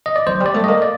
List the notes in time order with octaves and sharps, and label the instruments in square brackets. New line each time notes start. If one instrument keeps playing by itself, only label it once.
[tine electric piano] D#5
D5
[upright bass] F#3 [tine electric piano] C5
[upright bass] G3
[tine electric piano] D5
[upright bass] A3
[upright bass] A#3 [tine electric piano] D#5
[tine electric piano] D5